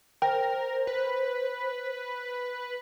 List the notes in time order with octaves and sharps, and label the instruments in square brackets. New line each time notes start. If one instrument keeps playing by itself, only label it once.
[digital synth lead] A#4 [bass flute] C5 [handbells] G5
[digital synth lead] B4